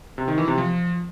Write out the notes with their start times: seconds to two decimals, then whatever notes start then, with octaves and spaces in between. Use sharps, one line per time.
0.18 C3
0.28 D#3
0.38 E3
0.48 C3
0.58 F3